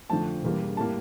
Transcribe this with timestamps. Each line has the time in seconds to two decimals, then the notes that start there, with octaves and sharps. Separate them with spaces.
0.09 F2 D3 F3 A3 A5
0.43 E1 E2 E3 G3 A#3
0.77 A2 G3 A#3 A5